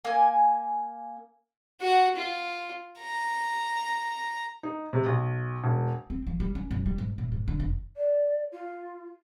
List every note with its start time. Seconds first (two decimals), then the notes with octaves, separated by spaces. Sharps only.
0.05 A#3 G#5
1.81 F#4 F#5
2.16 F4
2.99 A#5
4.63 D#4
4.93 C3
5.06 B1
5.64 E1
6.10 C4
6.27 F3
6.40 G3
6.55 C#4
6.71 F#2
6.86 G3
6.98 G#2
7.18 A2
7.32 G#2
7.48 D3
7.60 F1
7.96 D5
8.52 F4